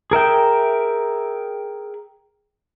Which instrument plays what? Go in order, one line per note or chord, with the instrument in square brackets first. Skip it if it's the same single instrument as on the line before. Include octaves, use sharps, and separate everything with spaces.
[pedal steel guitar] G#4 A#4 E5 G5